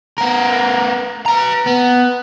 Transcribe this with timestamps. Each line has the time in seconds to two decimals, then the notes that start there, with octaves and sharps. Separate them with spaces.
0.18 B3 A#4
1.26 B4 A#5
1.67 B3